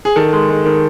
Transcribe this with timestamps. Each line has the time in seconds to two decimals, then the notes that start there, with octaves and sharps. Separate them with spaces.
0.05 G#4
0.16 D#3 A4
0.33 G#3
0.50 G#3
0.66 D#3